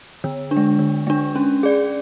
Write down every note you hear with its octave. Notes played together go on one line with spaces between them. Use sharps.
D3
D4
G#3
D3
G#3 D4
C#4
G#4 D5